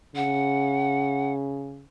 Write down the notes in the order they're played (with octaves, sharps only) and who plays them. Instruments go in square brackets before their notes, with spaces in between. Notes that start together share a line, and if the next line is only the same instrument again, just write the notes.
[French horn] C#3 [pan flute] F#5